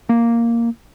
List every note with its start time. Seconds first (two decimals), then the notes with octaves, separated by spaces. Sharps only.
0.09 A#3